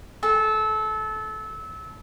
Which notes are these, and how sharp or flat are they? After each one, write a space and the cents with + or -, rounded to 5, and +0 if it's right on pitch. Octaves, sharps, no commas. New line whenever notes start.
A4 -25